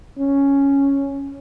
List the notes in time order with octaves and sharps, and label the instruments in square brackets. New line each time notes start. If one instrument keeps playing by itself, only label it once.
[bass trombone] C#4